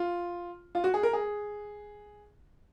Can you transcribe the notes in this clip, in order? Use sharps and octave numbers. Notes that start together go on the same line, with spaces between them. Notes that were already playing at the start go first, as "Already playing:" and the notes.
Already playing: F4
F4
F#4
G#4
A#4
G#4